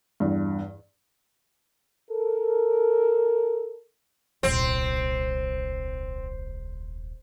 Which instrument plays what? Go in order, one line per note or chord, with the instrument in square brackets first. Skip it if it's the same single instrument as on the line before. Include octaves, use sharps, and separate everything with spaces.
[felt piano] E2 G2
[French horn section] A4 A#4
[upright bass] D#1 C2 [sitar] C4